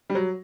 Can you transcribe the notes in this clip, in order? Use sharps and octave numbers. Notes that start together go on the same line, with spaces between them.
G3
F#3